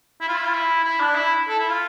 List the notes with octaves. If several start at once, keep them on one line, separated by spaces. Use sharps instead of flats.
E4
F4
E4
F4
E4
E4
D4
E4
A4
E4
F4